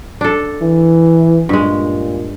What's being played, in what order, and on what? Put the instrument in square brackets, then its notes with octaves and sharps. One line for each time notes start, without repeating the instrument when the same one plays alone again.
[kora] D4 A4
[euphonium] E3
[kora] G2 G#3 [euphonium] A#2